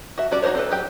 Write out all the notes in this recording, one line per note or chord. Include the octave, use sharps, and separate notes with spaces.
F#4 E5
G3 C#4 F#4 D5
D#4 F#4 A#4 C5 C#5
C4 A4 B4
F#3 G4 G5